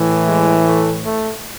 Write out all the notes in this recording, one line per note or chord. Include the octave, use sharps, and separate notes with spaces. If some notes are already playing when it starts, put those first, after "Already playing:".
Already playing: A2 E3
G#3
A3
A3